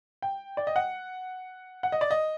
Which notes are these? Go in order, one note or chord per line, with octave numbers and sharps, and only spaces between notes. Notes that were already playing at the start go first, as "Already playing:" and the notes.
G5
D5
D#5
F#5
F#5
D#5
D5
D#5